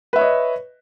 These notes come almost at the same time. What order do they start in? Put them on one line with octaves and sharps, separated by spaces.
B4 E5 C#5 D#5